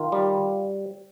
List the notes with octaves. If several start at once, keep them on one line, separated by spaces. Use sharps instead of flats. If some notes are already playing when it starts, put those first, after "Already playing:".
Already playing: D#3 F4
G3